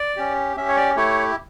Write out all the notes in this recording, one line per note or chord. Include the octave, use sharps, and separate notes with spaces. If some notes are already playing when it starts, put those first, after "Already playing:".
Already playing: D5
C#4 G4
C#4 G4 E5
C#5
D5
A3 E4 G4 C#5